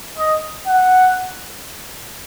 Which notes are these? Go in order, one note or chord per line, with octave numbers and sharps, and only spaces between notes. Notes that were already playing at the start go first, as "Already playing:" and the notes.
D#5
F#5